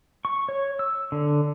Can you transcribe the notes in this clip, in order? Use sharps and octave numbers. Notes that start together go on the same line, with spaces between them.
C#6
C#5
E6
D3